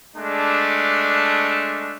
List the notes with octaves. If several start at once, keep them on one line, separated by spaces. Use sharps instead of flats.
G#3 A3 D4